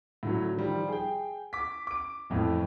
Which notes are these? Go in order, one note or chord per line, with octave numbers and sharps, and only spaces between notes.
A2 D3 F#3
D#3 F3 G3
G#4 G5
D6 B6
D6 D7
A1 F2 A2